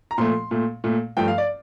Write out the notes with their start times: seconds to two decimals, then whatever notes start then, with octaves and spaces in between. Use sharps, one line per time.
0.11 A#5
0.18 A#2 F3 A3 C6
0.51 A#2 A3
0.84 A#2 A3
1.17 G2 F3 A3 G5
1.28 F5
1.38 D5